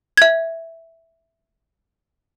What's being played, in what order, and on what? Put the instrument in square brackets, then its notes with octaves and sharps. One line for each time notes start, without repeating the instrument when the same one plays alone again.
[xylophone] E5 G#6